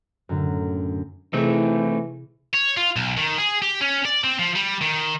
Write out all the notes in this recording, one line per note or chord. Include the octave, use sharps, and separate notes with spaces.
F#2 A2 D3 F#3
C3 E3 A3 C4 D#4 E4 G#4
C#5
F4
B1
D#3
G#4
G4
C#4
D5
C4
F3
G3
D#3